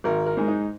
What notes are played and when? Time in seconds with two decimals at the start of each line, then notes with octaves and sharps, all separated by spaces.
0.04 G#1 A#4
0.26 A#4
0.37 G#2 G#3
0.48 D#4